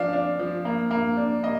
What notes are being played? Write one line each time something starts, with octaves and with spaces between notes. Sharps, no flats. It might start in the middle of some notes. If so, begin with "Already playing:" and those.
Already playing: F3 D4 F5
D4
F3
A#3
A#3
D4
A#3 D#5